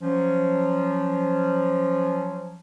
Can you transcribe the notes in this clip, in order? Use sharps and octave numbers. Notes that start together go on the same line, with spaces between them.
F3 F#3 C#4